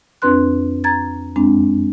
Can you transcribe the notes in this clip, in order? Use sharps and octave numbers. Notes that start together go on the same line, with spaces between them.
F2 C4 D4 B4 C6 F#6
A#5 G#6 A6
F#2 G#3 C4 D4